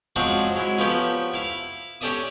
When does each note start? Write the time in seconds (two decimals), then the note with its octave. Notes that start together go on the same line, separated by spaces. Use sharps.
0.16 F3 F#3 G#3 C4 D4 F#4
0.55 F#3 G#3 E4
0.79 F3 A3 B3 C#4 G4
1.33 E4 F5
2.01 C#4 G4 A4 D5 E5 D#6